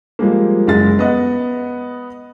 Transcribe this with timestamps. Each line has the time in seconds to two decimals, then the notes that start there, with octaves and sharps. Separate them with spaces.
0.19 F3 G3 G#3 A#3
0.67 F#1 G#3 A6
0.99 B3 D#5 F#5